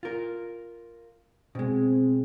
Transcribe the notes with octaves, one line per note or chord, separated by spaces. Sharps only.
F4 A#4
B2 G#3 C4